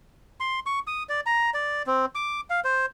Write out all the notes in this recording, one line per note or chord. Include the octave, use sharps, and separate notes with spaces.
C6
C#6
D#6
D5
A#5
D5
C4
D6
F5
C5